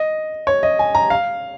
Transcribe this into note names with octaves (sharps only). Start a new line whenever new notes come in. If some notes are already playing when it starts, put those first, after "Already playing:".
Already playing: D#5
C#5
D#5
G#5
A#5
F5